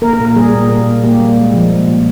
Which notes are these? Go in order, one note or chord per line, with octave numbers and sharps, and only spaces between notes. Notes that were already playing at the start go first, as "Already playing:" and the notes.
A#3 A#4
A#4
A#2
A#4
G3 G#4
A#2
A#3
A#2
A#3 G4
G3
G#3
F3
A#2
A#2